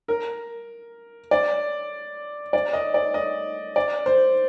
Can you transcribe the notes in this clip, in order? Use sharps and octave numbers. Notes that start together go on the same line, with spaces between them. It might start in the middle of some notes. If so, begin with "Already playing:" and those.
A#4
D5
D5
D#5
D5
D#5
D5
C5